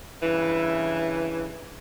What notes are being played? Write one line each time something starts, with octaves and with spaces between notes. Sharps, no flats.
G2 C#3 E3